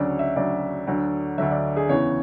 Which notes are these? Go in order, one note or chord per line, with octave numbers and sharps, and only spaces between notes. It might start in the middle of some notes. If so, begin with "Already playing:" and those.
Already playing: D2 C#3 F#3 D5
E5
D2 C#3 F#3 D5
D2 D3 F#3
D2 D3 F#3 E5
D5
G#4
E2 C#3 E3 C#5